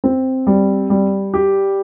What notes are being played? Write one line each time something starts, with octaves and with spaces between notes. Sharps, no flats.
C4
G3
G3
G4